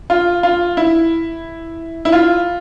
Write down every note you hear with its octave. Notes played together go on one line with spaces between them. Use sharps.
F4
F4
E4
E4
F4